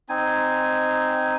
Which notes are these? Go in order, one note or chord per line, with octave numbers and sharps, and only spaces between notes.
C4 D#4 G#5